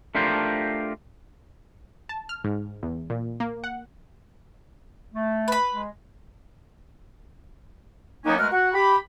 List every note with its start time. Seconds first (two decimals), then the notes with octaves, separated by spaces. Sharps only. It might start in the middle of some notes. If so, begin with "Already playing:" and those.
0.15 A3 D4 F4 G4 A#4 C5
2.09 A5
2.29 F6
2.44 G#2
2.83 E2
3.10 A#2
3.40 A#3
3.64 F#5
5.13 A3
5.48 B4 B5
5.73 G#3
8.25 D#3 F#3 A#3 B3 C#4 D#4
8.39 B2 G#3 A3 A#4 F#5 F6
8.52 F#4 F#5
8.74 G4 B5